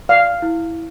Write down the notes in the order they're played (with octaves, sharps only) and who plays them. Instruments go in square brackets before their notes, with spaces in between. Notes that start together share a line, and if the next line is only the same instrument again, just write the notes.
[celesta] D5 [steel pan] F5
[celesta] E4